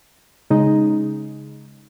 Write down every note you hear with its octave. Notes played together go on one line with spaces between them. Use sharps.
C#3 G#3 D#4